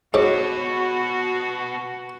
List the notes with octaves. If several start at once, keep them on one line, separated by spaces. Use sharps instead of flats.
G#2 B2 F#4 C#5 D6